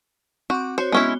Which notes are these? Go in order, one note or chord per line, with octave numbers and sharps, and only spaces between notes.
C4 F#4 D6
F#4 C5 C#5
G#3 B3 C#4 E4 G7